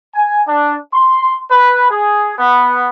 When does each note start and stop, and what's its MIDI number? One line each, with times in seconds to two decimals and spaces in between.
0.15 0.41 80
0.48 0.76 62
0.93 1.39 84
1.51 1.90 71
1.90 2.38 68
2.38 2.89 59